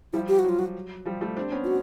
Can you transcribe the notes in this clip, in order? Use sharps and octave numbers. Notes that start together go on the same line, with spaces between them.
F3 G3 E4
G4
F#4
F#3 F4
F#3 F#4
F3 G3
G3 A3
C4 D4
B3 C#4
F4
F#4